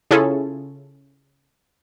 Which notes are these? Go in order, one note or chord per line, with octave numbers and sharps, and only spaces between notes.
C#3 C#4 E4 F4 G#4 A4